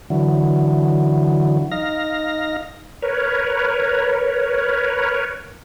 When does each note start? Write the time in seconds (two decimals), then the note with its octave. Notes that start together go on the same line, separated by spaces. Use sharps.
0.10 D3 E3 F#3
1.71 D#4 F5 A#6
3.02 A#4 B4 C#5